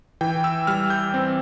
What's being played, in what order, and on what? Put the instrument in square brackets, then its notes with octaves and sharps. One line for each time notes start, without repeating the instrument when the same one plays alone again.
[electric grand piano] E3 G5
E6
G3 F6
G6
C4